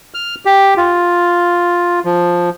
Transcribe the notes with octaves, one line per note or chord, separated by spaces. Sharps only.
F6
G4
F4
F3